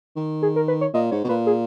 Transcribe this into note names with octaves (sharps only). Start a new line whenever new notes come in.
D#3
G#4
A#4
B4
C#5
A#2 D#5
G#2 C#5
B2
A#2 B4
G#4